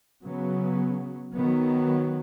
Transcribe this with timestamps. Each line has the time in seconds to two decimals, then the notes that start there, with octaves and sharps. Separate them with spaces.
0.24 C#3 F#3 B3
1.35 D#3 F#3 B3